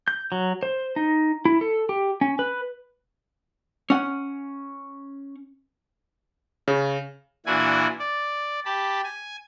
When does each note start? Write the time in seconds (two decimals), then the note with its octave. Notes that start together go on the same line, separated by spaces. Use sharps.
0.08 G6
0.32 F#3
0.63 C5
0.96 D#4
1.45 E4
1.61 A4
1.89 G4
2.21 C#4
2.39 B4
3.90 C#4 F#5
6.68 C#3
7.46 A#2 E3 D4 E4 F#4 G#5
7.99 D5
8.65 G4 A5 B5
9.04 G#5